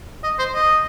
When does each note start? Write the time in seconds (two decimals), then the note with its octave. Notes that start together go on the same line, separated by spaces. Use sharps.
0.23 D#5
0.39 C5
0.54 D#5